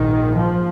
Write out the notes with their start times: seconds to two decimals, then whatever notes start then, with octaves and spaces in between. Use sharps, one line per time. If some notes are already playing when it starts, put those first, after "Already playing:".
Already playing: A#1 G#2 D#3
0.37 F3